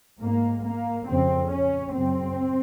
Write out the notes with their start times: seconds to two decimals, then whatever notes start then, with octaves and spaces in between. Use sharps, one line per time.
0.19 G#2 A#3
0.63 A#3
1.07 F2 C#3 C4
1.51 C#4
1.95 F#2 C#3 C4